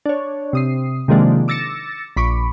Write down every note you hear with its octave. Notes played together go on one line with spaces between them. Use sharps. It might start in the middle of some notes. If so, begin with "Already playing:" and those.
D4 C#5
C3 D#6 C7
C3 D#3 F3 G#3 A#3 D4
D6 E6 A6 A#6 C#7 E7
A#1 B5 C#6 D6